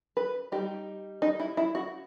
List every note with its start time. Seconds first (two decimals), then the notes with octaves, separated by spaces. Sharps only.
0.17 B4
0.52 G3 D#4 G4
1.22 D#4
1.40 E4
1.57 E4
1.75 F#4